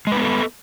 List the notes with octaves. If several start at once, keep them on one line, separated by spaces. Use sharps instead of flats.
G#3 B3 A4 B4